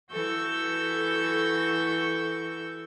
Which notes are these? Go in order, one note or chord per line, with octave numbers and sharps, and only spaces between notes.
E3 F#4 A4 C#6 E6 G6